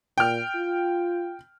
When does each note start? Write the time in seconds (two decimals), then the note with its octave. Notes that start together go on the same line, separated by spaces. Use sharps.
0.18 A#2 G5 F6
0.55 F4